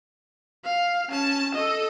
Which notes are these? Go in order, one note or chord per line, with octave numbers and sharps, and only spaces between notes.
F5
C#4 A5
A4 D#5